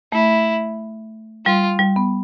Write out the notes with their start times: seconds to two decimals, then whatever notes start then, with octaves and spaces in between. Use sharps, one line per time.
0.12 A3 E4
1.46 G3 F4
1.79 G3
1.96 B3